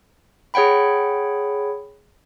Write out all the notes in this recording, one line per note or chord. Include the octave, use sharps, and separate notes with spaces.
G#4 C#5 F#5 G5 B5